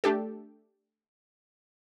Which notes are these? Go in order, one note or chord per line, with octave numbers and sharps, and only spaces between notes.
A3 D4 G4 A4